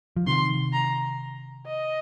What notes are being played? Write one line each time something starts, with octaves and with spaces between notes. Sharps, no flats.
F3
C3 D#3 C6
A#5
D#5